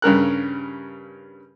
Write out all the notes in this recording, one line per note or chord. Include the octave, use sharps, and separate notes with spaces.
G2 C#3 A#4 F#6